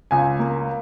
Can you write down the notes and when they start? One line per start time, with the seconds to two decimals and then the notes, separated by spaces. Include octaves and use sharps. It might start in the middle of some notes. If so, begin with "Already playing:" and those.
0.11 C#2 G#5
0.39 A#3